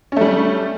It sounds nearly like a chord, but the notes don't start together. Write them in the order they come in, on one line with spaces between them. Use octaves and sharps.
C#4 A3 G3